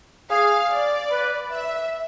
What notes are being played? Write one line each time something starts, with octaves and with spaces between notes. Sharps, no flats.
G#4 F5
D5
B4
E5